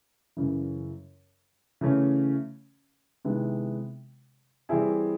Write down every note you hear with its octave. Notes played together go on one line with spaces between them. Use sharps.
F#2 C#3 E3
C#3 E3 A3 C#4
C3 D#3 G#3 B3 E4
E3 G3 C4 E4 G#4